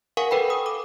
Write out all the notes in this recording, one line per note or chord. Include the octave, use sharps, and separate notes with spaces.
A#4 F5 F#5 G#5 C#6
A4 B4 G5 B5
D#6
D6